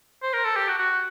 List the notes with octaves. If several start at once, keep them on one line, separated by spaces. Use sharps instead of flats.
C5
A#4
A4
G4
F#4
F#4